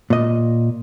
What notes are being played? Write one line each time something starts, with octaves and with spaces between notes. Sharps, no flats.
A#2 D#5